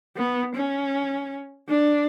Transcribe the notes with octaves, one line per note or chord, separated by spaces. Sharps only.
B3
C#4
D4